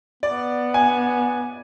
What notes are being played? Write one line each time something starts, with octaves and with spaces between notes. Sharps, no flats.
B3 D5
G#5